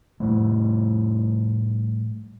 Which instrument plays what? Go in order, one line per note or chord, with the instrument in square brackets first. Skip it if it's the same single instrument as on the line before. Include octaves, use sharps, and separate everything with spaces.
[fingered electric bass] A2 F3 G3 A3